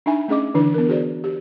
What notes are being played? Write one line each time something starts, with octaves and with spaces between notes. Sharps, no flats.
D4 D#4 E5 G#5 B5
A3 C#4 G#4 D#5 D6
D3 E3 D4 E4 B4
B3 A#4
F#4 G#4 C5 D5
G4